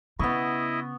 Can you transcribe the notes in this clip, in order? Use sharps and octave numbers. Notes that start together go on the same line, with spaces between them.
C#3 B3 E4 D#5 C#6